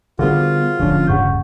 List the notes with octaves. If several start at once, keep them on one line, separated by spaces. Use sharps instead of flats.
D3 G3 B3 F4 F#4 G#4 A#4 C5
D1 D#2 D3 F3 C#4
G2 C#3 F#5 C#6 G6